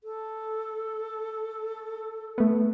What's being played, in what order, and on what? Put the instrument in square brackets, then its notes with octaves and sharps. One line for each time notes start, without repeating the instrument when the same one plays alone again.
[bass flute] A4
[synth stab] A3 B3